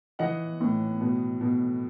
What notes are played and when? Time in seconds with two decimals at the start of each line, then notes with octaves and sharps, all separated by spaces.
0.19 E3 D#5 F#5
0.61 A2
1.01 B2
1.41 B2